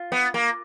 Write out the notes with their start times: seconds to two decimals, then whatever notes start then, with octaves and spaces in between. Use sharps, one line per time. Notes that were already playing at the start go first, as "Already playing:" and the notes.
Already playing: F4
0.12 B3
0.34 A#3